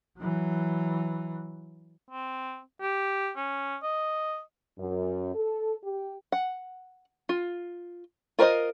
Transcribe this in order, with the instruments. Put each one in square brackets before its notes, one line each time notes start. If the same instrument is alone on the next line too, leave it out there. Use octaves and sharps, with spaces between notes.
[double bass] E3 F#3
[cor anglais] C4
G4
C#4
D#5
[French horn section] F#2
A4
G4
[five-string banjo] F#5
F4
F4 A#4 C5 D5 D#5